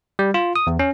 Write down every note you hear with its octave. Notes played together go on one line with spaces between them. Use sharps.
G3
F4
D#6
E2
C#4